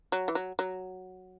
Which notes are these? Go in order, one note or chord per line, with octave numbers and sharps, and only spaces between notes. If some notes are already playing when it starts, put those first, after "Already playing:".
F#3
E3
F#3
F#3